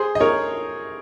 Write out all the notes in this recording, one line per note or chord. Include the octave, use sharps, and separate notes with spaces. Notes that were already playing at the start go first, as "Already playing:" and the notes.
Already playing: G#4 C5
D#5
A#4 C#5